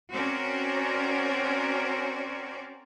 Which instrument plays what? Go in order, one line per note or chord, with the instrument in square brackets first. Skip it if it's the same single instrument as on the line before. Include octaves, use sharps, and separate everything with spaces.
[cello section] C4 C#4 F#4 A#4 C#5 D5